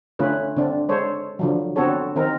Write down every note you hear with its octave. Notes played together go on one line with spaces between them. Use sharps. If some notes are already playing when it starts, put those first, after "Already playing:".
D3 A3 C#4 F4 B4
D3 C4 D4
G#3 A4 C5 C#5
D3 F3 F#3
D3 B3 C4 F#4 A4 C#5
D#3 C4 D#4 A#4